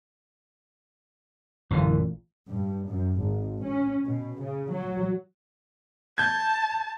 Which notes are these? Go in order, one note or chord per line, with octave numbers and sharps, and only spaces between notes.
A1 F#2 A#2 D3 E3
G2
F#2
G#1
C#4
B2
C#3
F#3
A5 G6 G#6